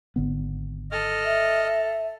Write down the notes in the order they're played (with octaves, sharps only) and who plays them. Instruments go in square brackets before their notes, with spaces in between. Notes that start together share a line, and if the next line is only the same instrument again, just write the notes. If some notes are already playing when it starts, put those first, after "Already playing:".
[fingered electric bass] G#1 D3 B3
[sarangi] A4 [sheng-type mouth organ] D#5 F6
[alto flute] E5